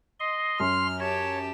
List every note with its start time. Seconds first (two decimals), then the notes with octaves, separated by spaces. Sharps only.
0.20 D#5 C6
0.60 F#2 C6 F6
1.00 G4 C#5 A5